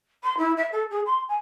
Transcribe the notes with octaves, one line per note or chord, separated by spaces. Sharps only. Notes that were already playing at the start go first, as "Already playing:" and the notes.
C6
E4
E5
A4
G#4
C6
G#5